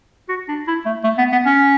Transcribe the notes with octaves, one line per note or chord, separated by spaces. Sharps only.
F#4
D4
E4
A3
A3
B3
B3
C#4